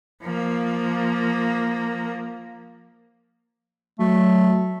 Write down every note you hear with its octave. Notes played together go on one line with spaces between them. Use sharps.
F3 A#3
F#3 A3